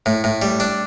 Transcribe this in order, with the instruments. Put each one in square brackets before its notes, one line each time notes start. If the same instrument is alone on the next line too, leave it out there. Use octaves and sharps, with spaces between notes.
[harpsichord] A2
A2
G3
D4